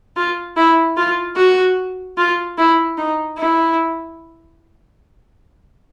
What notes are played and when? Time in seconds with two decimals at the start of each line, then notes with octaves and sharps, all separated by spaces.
0.17 F4
0.57 E4
0.97 F4
1.36 F#4
2.18 F4
2.58 E4
2.98 D#4
3.38 E4